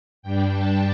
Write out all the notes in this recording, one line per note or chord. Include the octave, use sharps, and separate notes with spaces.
G2 G3 D4 G5
A5